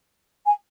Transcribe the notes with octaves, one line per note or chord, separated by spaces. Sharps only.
G#5